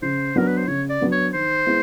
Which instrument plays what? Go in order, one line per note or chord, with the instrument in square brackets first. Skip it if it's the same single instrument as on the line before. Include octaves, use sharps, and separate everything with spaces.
[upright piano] C#3 [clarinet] C5
[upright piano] F#3 B3 D4 [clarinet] A#4
[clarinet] B4
C5
[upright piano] C#3 [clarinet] C#5
[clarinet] D5
[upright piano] F#3 B3 D4
[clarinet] C#5
[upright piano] D#3 [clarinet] C5
[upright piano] G#3 B3 E4